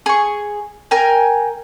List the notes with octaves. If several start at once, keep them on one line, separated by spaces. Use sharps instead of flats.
G#4 C#6
A#4 G5 G#5